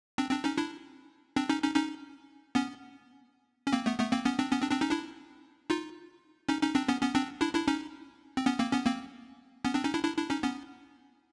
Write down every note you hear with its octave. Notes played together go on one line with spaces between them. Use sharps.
C4 D4
C4 D4
C#4 D#4
D4 E4
C4 D4
C#4 D#4
C#4 D#4
C#4 D#4
B3 C#4
C#4
A#3 C4
A3 B3
A3 B3
A#3 C4
B3 C#4
C4 D4
B3 C#4
C4 D4
C4 D4
C#4 D#4
D4 E4
D#4 F4
C#4 D#4
C#4 D#4
C4 D4
B3 C#4
B3 C#4
C4 D4
D4 E4
D4 E4
C#4 D#4
C4
B3 C#4
A#3 C4
B3 C#4
A#3 C4
B3 C#4
C4 D4
C#4 D#4
D4 E4
D4 E4
D4 E4
C#4 D#4
B3 C#4